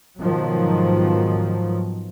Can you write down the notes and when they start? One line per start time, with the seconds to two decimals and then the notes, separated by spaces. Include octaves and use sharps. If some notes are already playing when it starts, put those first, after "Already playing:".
0.20 G#2 B2 D#3 F3 F#3